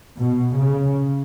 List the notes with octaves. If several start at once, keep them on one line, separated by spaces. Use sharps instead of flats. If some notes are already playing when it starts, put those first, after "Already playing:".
B2
C#3